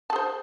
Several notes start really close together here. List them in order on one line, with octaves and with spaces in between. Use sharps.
A5 G#4 C5